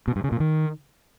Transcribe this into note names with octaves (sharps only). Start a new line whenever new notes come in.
B2
G2
C#3
A#2
D#3